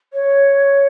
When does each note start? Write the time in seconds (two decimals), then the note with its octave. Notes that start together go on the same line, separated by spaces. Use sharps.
0.13 C#5